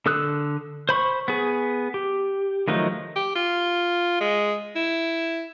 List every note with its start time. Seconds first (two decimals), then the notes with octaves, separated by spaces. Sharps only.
0.06 D3 A4 D#6 E6 F#6
0.89 C5 B5 C#6
1.28 B3 G#4
1.94 G4
2.68 D#3 F3 F#3 A3 D#4
3.16 G4
3.36 F4
4.21 G#3
4.76 E4